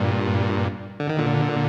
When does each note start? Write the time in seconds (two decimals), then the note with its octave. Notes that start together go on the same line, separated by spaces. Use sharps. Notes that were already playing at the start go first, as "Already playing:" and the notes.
Already playing: G2 A#2
1.00 D3
1.09 D#3
1.18 A#2 D3